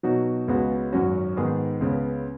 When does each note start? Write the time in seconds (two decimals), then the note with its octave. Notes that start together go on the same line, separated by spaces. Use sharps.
0.03 B2 F#3 D#4 F#4
0.48 C#2 C#3 G#3 B3 F#4
0.92 G#1 F#2 F#3 C#4 F#4
1.37 G#2 D#3 G#3 B3 G#4
1.80 C#2 C#3 B3